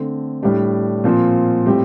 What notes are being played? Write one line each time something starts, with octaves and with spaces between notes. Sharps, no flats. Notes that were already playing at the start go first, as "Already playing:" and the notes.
Already playing: D3 A3 C4
A2 G3 D4 G4
A#2 F3 C4 F4
A2 G3 C4 G4